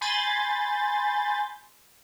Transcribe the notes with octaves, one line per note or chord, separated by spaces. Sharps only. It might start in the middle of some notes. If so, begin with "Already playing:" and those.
G#5 B5 C6 G6 A6